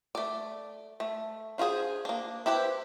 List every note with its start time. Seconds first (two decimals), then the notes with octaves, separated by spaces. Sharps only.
0.15 A3 D5
1.00 A3
1.58 D4 F4 F#4 G#4 C5
2.05 A#3 D4
2.46 E4 G4 B4 C5